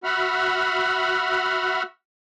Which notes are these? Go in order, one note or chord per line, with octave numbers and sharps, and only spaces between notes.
F#4 E5 F#5 B5 F6